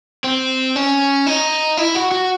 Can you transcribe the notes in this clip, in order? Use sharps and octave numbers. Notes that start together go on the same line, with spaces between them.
C4
C#4
D#4
E4
F#4
F#4